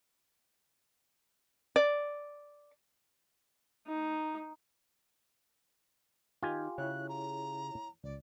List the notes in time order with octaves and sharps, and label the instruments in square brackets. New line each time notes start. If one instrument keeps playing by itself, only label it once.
[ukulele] D5
[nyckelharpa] D#4
[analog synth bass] D#3 [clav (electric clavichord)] F4 G4 G#5
[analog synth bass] C#3 [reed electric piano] E4 C#5 [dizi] F#6
[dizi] A#5
[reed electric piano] C#2 [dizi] D5